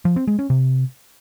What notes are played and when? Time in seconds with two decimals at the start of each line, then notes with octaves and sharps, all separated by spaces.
0.05 F3
0.16 C4
0.27 G#3
0.39 C#4
0.50 C3